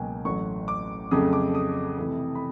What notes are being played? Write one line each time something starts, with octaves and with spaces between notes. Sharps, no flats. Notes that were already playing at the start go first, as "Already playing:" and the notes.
Already playing: C#2 B2 F#3 A#3 G5 G#5
A1 A2 F#3 C#6
D6
F2 C#3 F#3 A3 D#6
D6
D#6
F2 C3 E3 A3
B5